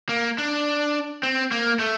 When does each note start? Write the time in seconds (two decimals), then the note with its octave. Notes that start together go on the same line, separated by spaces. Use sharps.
0.09 A#3
0.38 D4
1.23 C4
1.51 A#3
1.79 A3